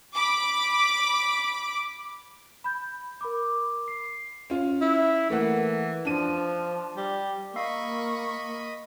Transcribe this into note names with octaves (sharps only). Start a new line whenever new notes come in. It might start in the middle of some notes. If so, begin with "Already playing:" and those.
B5 D6
B5 G6
A#4 B5 D6
C7
C#4 F4
E4
E3 A3 A#3 F#5
F3 D4 D#7
G3
A#3 D#5 F5 B5 C#6 E6 C7